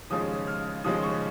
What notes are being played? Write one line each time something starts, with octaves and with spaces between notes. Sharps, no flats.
D#2 C#3 F3 G#3 C#4 D#6
F6
D#2 C#3 F3 G#3 C#4 D#6
C#6